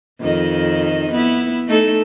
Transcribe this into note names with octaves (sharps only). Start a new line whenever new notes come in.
F2 D#3 D#5
B3 E4
A3 D#4 A4